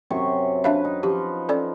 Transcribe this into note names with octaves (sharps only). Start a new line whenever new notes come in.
F#2 C3 C#6
D4 B4 E5 F5
D#4
F3 G4
C#4 A4 D5